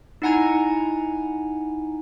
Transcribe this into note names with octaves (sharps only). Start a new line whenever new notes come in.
D#4 E4 F#5 G#5 A#5 G#6